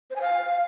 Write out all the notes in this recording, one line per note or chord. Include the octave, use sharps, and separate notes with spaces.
C5
G#5
F5